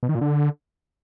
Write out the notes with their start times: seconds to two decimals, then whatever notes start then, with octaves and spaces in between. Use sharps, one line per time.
0.03 B2
0.09 D#3
0.15 A#2
0.21 D3